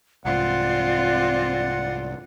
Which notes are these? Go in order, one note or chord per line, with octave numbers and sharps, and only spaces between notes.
C2 G#2 C4 F4 D5 F#5